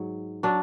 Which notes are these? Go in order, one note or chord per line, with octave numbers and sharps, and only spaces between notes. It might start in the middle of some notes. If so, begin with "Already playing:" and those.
Already playing: G#2 F#3
F#3 D4